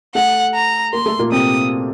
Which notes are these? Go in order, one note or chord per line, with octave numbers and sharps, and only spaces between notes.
A3 A4 F#5
A#5
A#3 A#4 C6
A3 A4
A#2 A#3
C3 C4 D#6